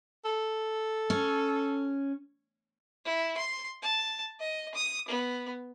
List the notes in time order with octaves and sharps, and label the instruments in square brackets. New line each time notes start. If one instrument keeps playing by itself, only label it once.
[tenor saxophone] A4
[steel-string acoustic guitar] C#4
[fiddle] E4
C6
A5
D#5
D#6
B3